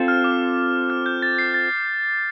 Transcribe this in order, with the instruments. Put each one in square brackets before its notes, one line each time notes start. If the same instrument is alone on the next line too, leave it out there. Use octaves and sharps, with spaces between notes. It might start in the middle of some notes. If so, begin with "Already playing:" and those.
Already playing: [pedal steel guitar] C4 F4 A4 C5
[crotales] F6
D6
F6
G6
A6
C7
A6